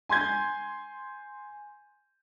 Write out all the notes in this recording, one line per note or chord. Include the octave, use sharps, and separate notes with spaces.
G#5 C6 G6 G#6